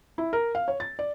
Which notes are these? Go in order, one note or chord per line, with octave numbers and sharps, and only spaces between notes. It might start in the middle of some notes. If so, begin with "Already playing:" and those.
E4
A#4
F5
C#5
A6
D5